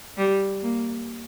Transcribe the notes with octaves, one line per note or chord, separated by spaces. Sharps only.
G3
A#3